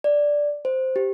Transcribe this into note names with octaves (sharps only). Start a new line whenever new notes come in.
D5
C5
G4